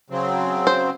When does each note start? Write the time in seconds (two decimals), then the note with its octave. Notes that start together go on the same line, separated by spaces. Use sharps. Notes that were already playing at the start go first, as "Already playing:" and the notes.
0.10 C#3 F#3 C4
0.67 C5